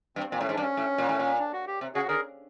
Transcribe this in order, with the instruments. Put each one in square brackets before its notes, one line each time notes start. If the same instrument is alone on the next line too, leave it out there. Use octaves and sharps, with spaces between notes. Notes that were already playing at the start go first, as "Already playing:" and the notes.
[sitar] G2 [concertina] C4
[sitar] A#2 [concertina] C4
[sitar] A2 [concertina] C#4
[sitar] G#2
[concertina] D4
[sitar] G2
[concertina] C#4
[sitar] A2
A#2
A2
A#2
[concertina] D4
F#4
G4
[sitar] C3
[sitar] C#3 [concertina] F#4 G#4
[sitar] D3 [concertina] G#4 A#4